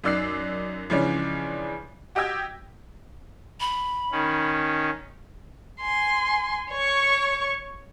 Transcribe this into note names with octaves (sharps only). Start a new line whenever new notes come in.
F#2 D#4 D5 E6 F#6 C7
C#3 E3 F3 G#3 C#4 D4
F#4 G4 D#5 G5 E6 G#6
B5
D#3 C#4
G#5 C6
C#5 C#6